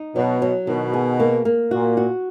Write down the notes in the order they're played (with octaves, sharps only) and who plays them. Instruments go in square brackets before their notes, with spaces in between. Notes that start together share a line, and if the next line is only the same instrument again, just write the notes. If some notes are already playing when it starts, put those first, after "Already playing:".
Already playing: [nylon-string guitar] D#4
[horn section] B2 [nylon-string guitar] F#3
[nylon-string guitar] F#3
[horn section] B2 [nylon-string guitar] D#3
[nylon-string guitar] G#4
A#3
A#3
[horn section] A#2 [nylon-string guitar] F#4
[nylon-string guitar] F#4